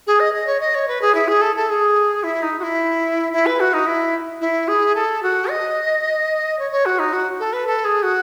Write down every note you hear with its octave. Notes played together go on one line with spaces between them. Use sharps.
G#4
D#5
D#5
C#5
D#5
C#5
B4
G#4
E4
G#4
A4
A4
G#4
E4
D#4
F#4
E4
E4
B4
F#4
D#4
E4
E4
G#4
A4
F#4
D#5
C#5
C#5
F#4
D#4
F#4
A4
B4
A4
G#4
F#4